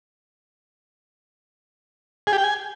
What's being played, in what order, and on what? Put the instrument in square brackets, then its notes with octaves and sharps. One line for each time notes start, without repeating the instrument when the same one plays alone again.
[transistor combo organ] G#4
G4
G5
G#5